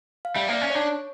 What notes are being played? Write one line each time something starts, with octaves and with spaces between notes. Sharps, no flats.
F5
G3 E5
A#3 D5
C#4
D4 C#5